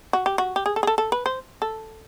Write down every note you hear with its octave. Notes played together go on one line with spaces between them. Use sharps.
F#4
G4
F#4
G4
G#4
A4
G#4
A4
A4
B4
C5
A4